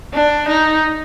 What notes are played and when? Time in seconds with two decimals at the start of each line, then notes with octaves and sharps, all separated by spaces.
0.14 D4
0.48 D#4